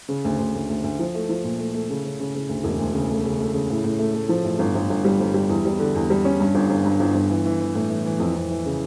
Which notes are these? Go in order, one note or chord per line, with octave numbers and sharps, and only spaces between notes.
C#3
D2
D2
D2
D2
D2
F3
A3
F3
A#2
A3
A3
C#3
C#3
C#3
C#3
D2
E1
D2
C#3
A3
C#3
A3
C#3
A2
A2
A3
A3
F3
A1
G1
G1
G1
G3
G1
G3
E2
G3
D3
E2
G3
C#4
G2
G1
G1
G2
G1
G1
E3
E3
E3
A2
E3
E3
F2
F2
E3
C#3